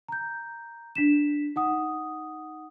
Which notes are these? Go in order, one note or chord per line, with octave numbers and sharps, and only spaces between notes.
A#5 G6
D4 B6 E7
D#4 F#5 D#6